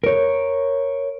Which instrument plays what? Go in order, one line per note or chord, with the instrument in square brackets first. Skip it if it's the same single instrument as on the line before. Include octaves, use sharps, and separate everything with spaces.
[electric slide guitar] A#4 C#5